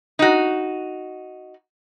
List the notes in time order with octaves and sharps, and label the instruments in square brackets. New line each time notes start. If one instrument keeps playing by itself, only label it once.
[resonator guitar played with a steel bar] D#4 F#4